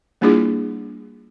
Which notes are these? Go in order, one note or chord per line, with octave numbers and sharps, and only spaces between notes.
G3 A#3 D4 E4 F4 G#4